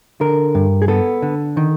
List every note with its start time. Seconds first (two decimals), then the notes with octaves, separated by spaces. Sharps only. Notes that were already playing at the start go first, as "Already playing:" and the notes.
0.21 D3 A#4
0.55 G2
0.82 G#4
0.88 B3 A4
1.22 D3
1.57 D#3